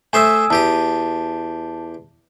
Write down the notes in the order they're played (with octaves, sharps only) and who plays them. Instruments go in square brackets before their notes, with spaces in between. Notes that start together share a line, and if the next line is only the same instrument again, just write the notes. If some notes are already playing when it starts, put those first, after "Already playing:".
[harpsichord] A3 C5 E5 [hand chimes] G#5 D#6 E6
[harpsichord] E2 G4 D#6 [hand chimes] A5